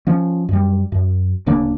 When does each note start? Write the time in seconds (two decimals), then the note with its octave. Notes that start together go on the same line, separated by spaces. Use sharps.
0.07 F3 C#4
0.49 F#2 G3
0.92 F#2
1.46 D1 C#3 A#3 D4